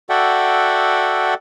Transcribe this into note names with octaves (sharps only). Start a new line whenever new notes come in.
F#4 A4 D5 E5 F#5 G5